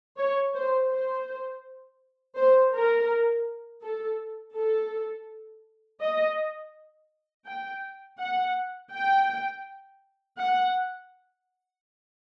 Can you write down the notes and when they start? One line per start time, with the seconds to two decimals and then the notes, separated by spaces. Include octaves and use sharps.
0.18 C#5
0.55 C5
0.90 C5
2.36 C5
2.73 A#4
3.83 A4
4.55 A4
6.01 D#5
7.46 G5
8.19 F#5
8.92 G5
10.38 F#5